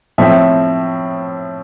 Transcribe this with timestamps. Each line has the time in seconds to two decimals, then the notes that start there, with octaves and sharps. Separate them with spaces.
0.18 A2 F3 C4 E5